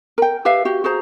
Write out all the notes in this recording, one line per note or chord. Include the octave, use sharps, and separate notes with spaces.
A#4 G5
G4 B4 E5 F5
F#4 G4
F#4 G#4 C5 A#5